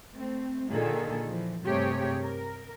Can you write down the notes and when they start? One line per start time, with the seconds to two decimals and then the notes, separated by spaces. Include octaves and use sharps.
0.14 A3 C4
0.70 A#2 D3 D#3 G#4 A4
1.27 E3 F3
1.64 G2 C3 A3 G4 G#4 C#5
2.21 A#4